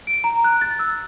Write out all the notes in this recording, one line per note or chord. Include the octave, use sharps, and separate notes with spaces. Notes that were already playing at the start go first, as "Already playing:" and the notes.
D7
A#5
F#6
A6
E6